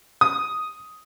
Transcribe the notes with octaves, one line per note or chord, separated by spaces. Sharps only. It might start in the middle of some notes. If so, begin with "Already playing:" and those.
D#6